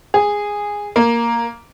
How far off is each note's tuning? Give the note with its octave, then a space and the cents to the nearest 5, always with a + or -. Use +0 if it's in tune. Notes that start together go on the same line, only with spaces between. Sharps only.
G#4 -10
A#3 +0